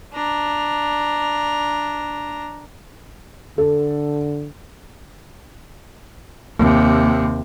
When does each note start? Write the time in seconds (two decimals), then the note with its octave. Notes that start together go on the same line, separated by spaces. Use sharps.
0.13 D4 A#5
3.58 D3 A4
6.56 D#2 C3